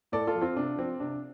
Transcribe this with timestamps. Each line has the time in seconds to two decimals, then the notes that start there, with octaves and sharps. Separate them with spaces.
0.12 A2 A4 D5
0.27 F4 A4
0.35 F3
0.41 C4 F4
0.56 C3 D4
0.78 F3 C4
1.00 C3 D4